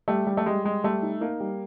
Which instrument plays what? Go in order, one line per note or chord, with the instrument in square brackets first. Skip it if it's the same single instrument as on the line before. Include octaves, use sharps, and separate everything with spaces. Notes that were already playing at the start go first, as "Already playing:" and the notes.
[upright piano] G3 [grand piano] A3
[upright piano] G3
[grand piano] A3
[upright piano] G3 [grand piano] G#3
[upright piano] G3 [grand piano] G#3
[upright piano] G3 [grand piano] A3
[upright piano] D#4
[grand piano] A#3 [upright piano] D#4
[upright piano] G3